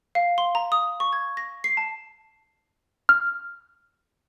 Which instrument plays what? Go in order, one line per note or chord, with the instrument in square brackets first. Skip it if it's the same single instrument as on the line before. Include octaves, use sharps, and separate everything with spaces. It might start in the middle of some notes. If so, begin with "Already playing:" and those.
[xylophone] F5
C6
A#5
D#6
C#6
G#6
A#6
C7
A5
[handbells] F6